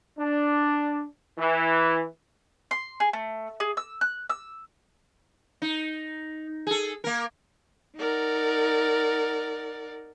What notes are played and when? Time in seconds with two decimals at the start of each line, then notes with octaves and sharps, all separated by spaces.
0.19 D4
1.38 E3
2.71 C6
3.00 G#4
3.13 A3
3.60 G#4
3.77 E6
4.01 F#6
4.29 E6
5.62 D#4
6.67 G#4 A4
7.04 A#3 A#4
7.97 D#4 A#4 D5 F#5